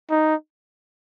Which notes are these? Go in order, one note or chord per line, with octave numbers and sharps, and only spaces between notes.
D#4